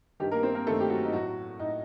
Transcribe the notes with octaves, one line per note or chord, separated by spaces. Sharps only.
G2 D#3 G3 G4
A#3 A#4
C4 C5
A#3 A#4
G2 D#3 A3 A4
G4
F#3 F#4
D#4
A2 F#3 F#4
A2 D#4